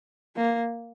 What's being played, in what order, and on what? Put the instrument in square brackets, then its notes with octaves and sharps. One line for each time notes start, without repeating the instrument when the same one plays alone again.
[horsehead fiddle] A#3